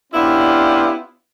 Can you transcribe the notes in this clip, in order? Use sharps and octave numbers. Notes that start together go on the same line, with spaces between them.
B3 C#4 D4 E4 F4 G4